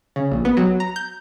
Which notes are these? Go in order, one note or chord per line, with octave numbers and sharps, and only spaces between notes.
C#3
A#1
B3
F#3
A#5
G6